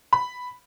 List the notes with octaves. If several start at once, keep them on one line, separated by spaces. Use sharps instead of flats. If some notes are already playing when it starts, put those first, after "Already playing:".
B5